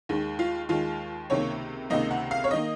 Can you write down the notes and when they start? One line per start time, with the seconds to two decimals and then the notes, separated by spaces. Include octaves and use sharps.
0.09 D#2 D#3 G#3
0.39 F4
0.69 D#2 D#3 G#3 F4
1.30 C#2 C3 D#3 A#3 C#5
1.90 C#2 C3 D#3 A#3 D#5
2.11 F#5
2.31 F5
2.44 C#5
2.51 D#3 A#3 D#5